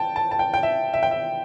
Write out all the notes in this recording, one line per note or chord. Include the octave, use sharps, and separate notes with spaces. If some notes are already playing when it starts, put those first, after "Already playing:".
Already playing: G5 A5
A5
A5
G5
G5
E5
E5
G5
E5